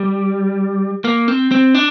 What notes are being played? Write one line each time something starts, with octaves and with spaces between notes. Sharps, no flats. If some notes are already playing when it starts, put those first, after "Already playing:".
Already playing: G3
A#3
C4
C4
D4